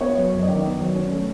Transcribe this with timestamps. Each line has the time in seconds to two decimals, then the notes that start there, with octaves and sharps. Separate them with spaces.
0.01 B3 C#5
0.17 F#3
0.33 F#2
0.43 D#5
0.48 D#3 D5
0.64 B3
0.80 F#3
0.95 C#4
1.12 A3